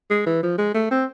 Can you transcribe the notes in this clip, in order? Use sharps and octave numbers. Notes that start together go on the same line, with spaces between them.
G#3
E3
F3
G#3
A3
C4